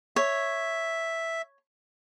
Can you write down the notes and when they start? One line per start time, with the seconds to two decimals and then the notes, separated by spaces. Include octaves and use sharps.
0.16 C#5 E5